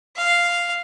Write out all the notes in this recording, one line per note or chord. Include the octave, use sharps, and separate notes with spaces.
F5